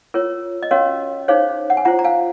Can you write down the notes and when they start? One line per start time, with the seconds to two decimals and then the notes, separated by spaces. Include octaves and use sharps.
0.14 F4 A#4 C#5
0.63 D#5
0.71 C#4 F#4 A#4 C#5 F5
1.28 D#4 G#4 C5 C#5 F5
1.70 F#5
1.77 G#5
1.85 F4 C5 F#5 A#5
1.99 A#5
2.04 F5 G#5